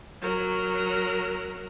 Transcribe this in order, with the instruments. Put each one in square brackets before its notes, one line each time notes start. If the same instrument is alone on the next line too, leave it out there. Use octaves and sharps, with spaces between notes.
[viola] F#3 A#4